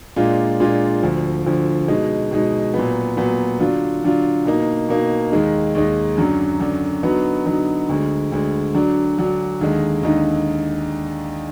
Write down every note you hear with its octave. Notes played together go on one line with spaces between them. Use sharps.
A#2 G#3 D4 F4
A#2 G#3 D4 F4
D2 D3 F3
D2 D3 F3
B2 G#3 D#4
B2 G#3 D#4
A#2 F#3 B3
A#2 F#3 B3
D3 F#3 D4 F4
D3 F#3 D4 F4
B2 A#3 D#4
B2 A#3 D#4
D#2 D#3 G#3 D#4
D#2 D#3 G#3 D#4
F#2 D3 F#3 D4
F#2 D3 F#3 D4
D3 F#3 B3 D#4
D3 F#3 B3 D#4
D2 D3 G#3
D2 D3 G#3
D3 F#3 D4
D3 F#3 D4
D#2 D3 G#3 D#4
D#2 D3 G#3 D#4